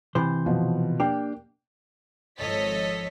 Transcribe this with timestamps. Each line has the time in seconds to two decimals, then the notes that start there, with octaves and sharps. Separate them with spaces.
0.15 C3 E3 C5
0.46 B2 F3
1.00 A#3 D4 G4 G5
2.39 G#1 F3 A4 C#5 D#5 B6